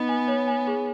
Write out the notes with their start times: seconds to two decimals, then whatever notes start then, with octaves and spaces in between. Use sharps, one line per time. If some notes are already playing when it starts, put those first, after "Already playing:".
Already playing: B3 D#4 B4 D#5
0.09 G#5
0.28 C#5
0.48 G#5
0.67 G#4